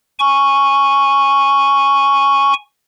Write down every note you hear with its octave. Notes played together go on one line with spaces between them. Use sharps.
G#5 C#6